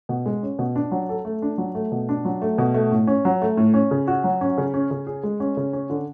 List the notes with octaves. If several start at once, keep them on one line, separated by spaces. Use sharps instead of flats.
B2
G#3
C#4
B2
D4
F#3
A4
A3
D4
F#3
A3
B2
D4
F#3
A3
B2
A3
A2
C#4
F#3
A3
A2
C#4
C#3
F#4
F#3
C#4
C#3
C#4
C#3
G#4
G#3
C#4
C#3
C#4
D3